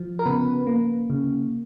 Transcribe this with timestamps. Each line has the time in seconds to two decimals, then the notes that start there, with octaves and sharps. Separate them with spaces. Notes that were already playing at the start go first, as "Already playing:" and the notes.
Already playing: F3
0.19 A#4
0.26 C#3 B3 B4
0.67 A#3
1.10 C#3